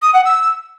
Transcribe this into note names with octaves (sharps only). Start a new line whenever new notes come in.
D#6
F#5
E6